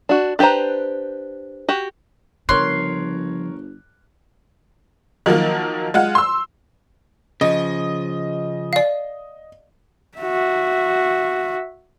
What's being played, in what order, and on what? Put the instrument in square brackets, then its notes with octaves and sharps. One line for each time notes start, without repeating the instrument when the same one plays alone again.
[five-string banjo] D4 F#4
D4 G4 B4 C5 A#5
F#4 G4
[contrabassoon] G1 [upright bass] C#3 F3 [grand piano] A#4 C#5 F#6 [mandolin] C6
[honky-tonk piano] D#3 F3 F#3 A#3
G#3 F4 F#5
C6 E6
[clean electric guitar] C#3 F3 [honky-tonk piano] D#5
[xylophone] D5 F5
[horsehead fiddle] F#4 E5